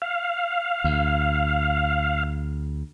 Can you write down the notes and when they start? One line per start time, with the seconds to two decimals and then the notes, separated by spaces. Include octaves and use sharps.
0.02 F5
0.84 D2